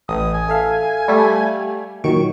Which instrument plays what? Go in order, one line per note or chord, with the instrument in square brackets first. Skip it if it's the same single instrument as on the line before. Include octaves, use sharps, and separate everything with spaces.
[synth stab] A1 [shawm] D#6
[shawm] G#5
[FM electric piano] A4 E5 F5
[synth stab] G3 A3
[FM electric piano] A#2 D#3 F#3 [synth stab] C#6 D7